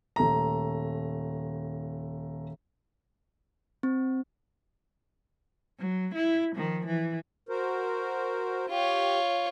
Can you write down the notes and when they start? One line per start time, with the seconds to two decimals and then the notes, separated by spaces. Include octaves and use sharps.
0.16 D#1 A3 A#5
3.83 C4
5.79 F#3
6.15 E4
6.56 D#3 F3
6.86 E3
7.49 F#4 A#4 C5
8.70 F4 G4 C#5